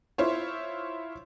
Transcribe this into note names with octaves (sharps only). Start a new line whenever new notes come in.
E4 F4 C5 C#5